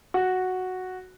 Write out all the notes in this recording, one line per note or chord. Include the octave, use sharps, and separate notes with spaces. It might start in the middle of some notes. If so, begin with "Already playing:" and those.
F#4